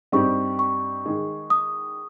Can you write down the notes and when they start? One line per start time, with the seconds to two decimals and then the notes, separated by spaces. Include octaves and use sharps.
0.12 G2 G3 C4 D#4 G4 C#6
0.59 C#6
1.05 D#3 G#3 D#4 G#4
1.50 D#6